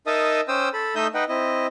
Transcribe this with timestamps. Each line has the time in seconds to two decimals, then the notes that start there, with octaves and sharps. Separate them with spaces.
0.07 D#4 A#4 D#5 E5 A5 D#6
0.48 C#4 C5 G5 D#6 E6
0.73 A4 B5
0.96 A3 D#4 D#5 E5 D#6 G6
1.14 D#4 B4 D#5 F#5 G5
1.29 C4 E4 D#5